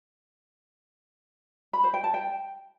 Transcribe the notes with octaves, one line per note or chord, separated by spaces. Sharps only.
B5
C5
G5
A5
G5